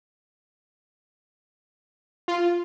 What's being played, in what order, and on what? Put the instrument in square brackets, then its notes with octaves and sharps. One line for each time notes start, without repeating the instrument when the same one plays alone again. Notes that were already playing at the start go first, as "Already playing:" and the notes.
[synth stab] F4